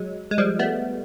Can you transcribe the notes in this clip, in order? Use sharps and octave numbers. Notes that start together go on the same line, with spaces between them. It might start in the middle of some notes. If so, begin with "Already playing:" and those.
Already playing: F#3 G#3
G#3
F3 G3
A3 B3